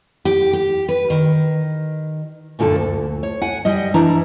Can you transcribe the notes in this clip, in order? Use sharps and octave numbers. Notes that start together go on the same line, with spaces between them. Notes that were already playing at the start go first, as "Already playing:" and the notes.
G4
G4
B4
D#3
F#2 A#2 D3 A4
D2
C#5
F#5 G#5
G3 D#5
E3 D4 E4 A#5